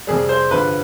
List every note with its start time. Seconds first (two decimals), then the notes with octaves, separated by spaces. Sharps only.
0.07 F2 C3 G3 G#4
0.29 C5
0.51 G2 D3 F3 B4